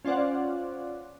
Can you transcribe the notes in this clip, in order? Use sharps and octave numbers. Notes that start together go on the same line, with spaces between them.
C#4 F4 C5 D5 F#5